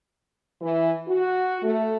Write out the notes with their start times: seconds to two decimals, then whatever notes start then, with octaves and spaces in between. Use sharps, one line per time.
0.60 E3
1.07 F#4
1.61 A3